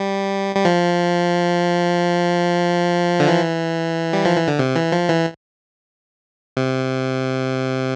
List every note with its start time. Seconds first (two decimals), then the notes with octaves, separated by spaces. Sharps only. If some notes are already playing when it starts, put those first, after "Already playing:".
Already playing: G3
0.55 G3
0.65 F3
3.20 D3
3.28 E3
4.13 G3
4.25 F3
4.36 E3
4.48 D3
4.59 C3
4.75 E3
4.92 F3
5.09 E3
6.57 C3